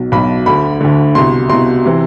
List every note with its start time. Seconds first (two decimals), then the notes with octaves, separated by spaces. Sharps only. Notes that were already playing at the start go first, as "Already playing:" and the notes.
Already playing: B1 B2
0.12 B1 B2 B5
0.46 D2 D3 B5
0.81 D2 D3
1.15 C2 B2 C6
1.50 C2 B2 C6
1.86 C3 E3